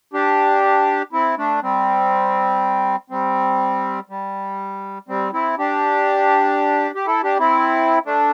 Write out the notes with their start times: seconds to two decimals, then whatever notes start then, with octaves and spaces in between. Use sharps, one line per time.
0.13 D4 G4
1.13 C4 E4
1.37 A3 D4
1.62 G3 C4
3.10 G3 C4
4.09 G3
5.08 G3 C4
5.33 C4 E4
5.58 D4 G4
6.95 G4
7.07 E4 A4
7.23 D4 G4
7.39 C4 E4
8.05 A3 D4